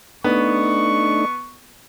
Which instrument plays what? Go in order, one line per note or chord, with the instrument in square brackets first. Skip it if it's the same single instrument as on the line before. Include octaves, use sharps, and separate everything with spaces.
[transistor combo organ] A3 D4 D#4 [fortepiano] B3 [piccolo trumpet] C#6